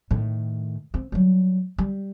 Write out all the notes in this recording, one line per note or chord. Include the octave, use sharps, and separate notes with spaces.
A2 D#3
C4
F#3 G3
G3